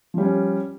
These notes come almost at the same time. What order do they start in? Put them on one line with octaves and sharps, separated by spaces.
F3 G3 C#4